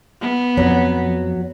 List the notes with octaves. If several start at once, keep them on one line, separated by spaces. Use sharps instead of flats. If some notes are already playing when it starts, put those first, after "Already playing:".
B3
F2 F#3